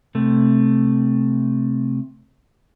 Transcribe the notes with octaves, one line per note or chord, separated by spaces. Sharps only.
C3 A3